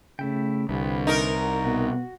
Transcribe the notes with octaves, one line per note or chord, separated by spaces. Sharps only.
C#3 A3 E4 G5
C2 D3 B4
D#4 A#4
B2 F#4